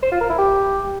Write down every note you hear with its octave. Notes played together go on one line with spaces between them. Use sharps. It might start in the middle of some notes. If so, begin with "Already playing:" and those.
C5
F4
A#4
E4
G4